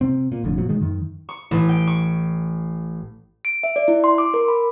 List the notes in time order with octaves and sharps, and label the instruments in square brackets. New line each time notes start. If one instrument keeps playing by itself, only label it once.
[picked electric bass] C3 C4
A#2
F1 F2 A2 D3
A#2 F3 F#3
A2 D#3 G#3
F#2 D#3
[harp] C#6
A1
G5
C#6
[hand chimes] D7
E5
D5
E4
C6
D6
A#4
B5